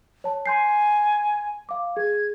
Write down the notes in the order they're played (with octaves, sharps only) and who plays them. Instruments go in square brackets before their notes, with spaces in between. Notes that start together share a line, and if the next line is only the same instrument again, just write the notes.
[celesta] C#5 A5
[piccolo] G#5 [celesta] C6 G6 C7
[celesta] F5 D6
[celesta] G#4 [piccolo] G#6